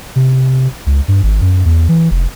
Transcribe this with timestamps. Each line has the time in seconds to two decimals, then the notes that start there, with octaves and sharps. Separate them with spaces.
0.16 C3
0.86 C#2
1.08 G2
1.23 G#1
1.41 F#2
1.65 E2
1.89 E3
2.11 F1